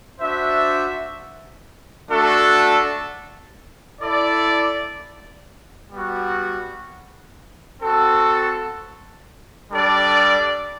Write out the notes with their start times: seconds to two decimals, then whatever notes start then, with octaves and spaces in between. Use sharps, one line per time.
0.20 D4 F#4 C5 E5
2.11 A3 D4 F#4 A4
4.01 E4 A4 D5
5.91 G3 B3 F#4
7.81 C4 F#4 A4
9.71 G3 D4 A4 D5